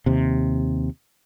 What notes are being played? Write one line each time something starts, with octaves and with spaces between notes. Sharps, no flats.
D#2 C3